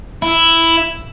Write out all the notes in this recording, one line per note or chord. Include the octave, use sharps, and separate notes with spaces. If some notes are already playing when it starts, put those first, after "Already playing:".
E4